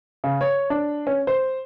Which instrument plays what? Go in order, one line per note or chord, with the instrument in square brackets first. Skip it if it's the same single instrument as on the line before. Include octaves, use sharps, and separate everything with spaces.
[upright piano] C#3
C#5
D4
C#4
C5